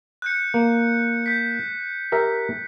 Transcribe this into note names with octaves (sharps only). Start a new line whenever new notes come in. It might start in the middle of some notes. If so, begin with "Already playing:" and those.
F#6 G6 C#7
A#3
G6 B6
G4 A#4 E5